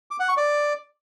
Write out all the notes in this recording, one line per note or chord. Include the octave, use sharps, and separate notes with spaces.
D6
F#5
C#6
D5